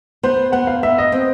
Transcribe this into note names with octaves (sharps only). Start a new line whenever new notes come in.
B3 C5
B3 F#5
F5
B3 E5
D#5
C4